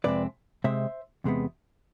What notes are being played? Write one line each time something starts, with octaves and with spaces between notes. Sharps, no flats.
F2 C3 G#3 C4 B4 D5
C3 G#3 C4 C5 E5
E2 C3 G#3 B3